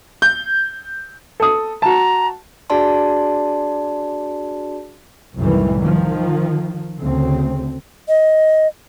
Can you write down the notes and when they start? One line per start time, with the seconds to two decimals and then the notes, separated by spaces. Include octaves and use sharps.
0.22 G6
1.40 A4 D#6
1.82 F#4 A5 A#5
2.70 D4 F#4 G#4 D5 A5 C6
5.36 C2 F#2 A2 D#3 E3 G3
5.78 D#3 F3
7.01 D2 C#3 C4
8.09 D#5